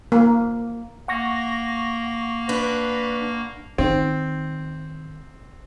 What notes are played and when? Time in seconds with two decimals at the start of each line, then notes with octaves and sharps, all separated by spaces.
0.12 A#3
1.08 A#3 F#5 C#6 A#6
2.49 D4 B4
3.78 D#3 C4